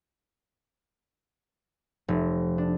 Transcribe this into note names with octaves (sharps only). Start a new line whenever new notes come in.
F1
D4